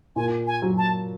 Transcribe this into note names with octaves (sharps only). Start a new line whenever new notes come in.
A#2 G#5
G#5
F#3
A5